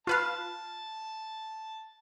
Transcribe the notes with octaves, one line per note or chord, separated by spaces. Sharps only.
F4 B4 F5 A5